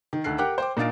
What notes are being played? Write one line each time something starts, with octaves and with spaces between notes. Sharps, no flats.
D#3
D2 D#3 A4 F#6 C7
G4 A#4 F#5 G5 D6 F#6
C5 G5 D6
A#2 D4 D#4 F5 A6 D7